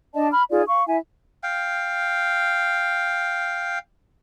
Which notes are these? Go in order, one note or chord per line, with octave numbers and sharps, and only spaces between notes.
D4 D5 D#5 A5
B5 F6
D#4 F4 G#4 D5
F5 C#6
E4 E5 G#5
F5 G5